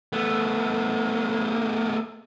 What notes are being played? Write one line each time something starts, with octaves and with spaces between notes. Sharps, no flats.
A3 B3